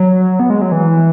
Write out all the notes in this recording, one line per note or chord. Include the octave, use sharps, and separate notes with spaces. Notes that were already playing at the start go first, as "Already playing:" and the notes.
Already playing: F#3
B3
G#3
F#3
E3